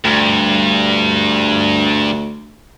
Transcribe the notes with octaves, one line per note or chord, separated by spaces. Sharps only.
D2 G2